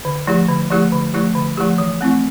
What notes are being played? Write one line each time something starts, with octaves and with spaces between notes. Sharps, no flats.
D3
F3 A3 E4 G4
D3
F3 A3 E4 G4
D3
F3 A3 E4 G4
D3
F3 A3 E4 G4
E3
A3 C4 E4